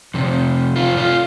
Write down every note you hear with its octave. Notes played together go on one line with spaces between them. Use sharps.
F2 C3
F4
F4